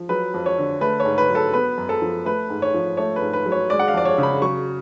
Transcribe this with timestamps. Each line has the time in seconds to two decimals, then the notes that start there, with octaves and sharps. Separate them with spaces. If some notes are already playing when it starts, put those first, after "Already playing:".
Already playing: F3
0.09 F#3 B4
0.34 F2
0.46 C#5
0.58 D3
0.81 A3 B4
1.00 C#5
1.05 G#2
1.18 B4
1.30 F#3
1.35 A4
1.53 B3 B4
1.77 F#2
1.89 A4
2.02 F3
2.25 A3 B4
2.50 G#2
2.62 C#5
2.74 F3
2.97 A3 C#5
3.16 B4
3.22 G#2
3.33 B4
3.46 F#3
3.52 C#5
3.70 G#3 D5
3.79 F#5
3.88 F5
3.94 F2 D5
4.05 C#5
4.18 C#3
4.23 B5
4.42 F#3 C#6